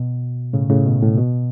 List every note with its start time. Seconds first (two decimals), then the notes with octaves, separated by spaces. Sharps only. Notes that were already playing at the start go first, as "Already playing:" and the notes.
Already playing: B2
0.53 A2 C#3
0.69 A2 C#3
0.86 B2
1.02 A2
1.18 B2